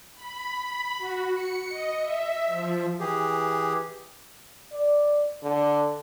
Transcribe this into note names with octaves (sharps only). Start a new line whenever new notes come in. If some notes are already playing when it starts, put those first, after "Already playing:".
B5
B5
F#4
C#7
D#5
E5
F3
E3 G4 G#4
D5
D3